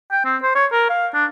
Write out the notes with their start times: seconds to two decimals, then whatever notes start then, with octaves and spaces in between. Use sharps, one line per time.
0.12 G5
0.25 C4
0.43 C5
0.55 C#5
0.72 A#4
0.90 F5
1.14 D4